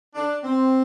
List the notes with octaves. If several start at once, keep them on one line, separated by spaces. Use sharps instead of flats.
D4
C4